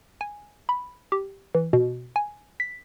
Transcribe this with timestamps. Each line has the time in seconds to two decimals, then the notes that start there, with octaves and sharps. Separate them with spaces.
0.21 G#5
0.69 B5
1.12 G4
1.55 E3
1.73 B2
2.16 G#5
2.60 B6